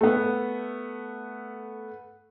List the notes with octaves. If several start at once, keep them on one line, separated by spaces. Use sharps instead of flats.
A3 B3